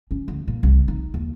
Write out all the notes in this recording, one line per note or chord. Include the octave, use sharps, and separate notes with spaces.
C#4
D2
A#2
C2
D#4
D#2